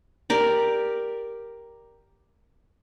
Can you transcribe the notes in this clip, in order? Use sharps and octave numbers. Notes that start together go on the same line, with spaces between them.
G4 A#4 D5